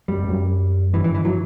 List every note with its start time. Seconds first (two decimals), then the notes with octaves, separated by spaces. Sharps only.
0.08 F#2 G3
0.24 G2
0.29 F#2
0.93 G2 E3
1.04 E3
1.15 E3
1.25 F#3